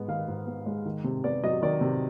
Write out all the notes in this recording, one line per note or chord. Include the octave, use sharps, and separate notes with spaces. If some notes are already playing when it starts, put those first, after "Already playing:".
Already playing: G#2 G#3 B3
D#3 F5
G#2
B3
G#3
D#3
C3
B3 D5
F#3 D#5
D#3 D5
C3